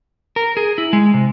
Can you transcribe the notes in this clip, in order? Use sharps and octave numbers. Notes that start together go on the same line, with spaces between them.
A#4
G#4
E4
G#3
C3